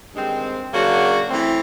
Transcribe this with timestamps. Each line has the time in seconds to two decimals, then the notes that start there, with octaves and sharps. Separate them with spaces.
0.13 G2 D#3 G#3 C4
0.72 C#3 F#3 A#3 D4 F#4
1.30 E3 A3 C4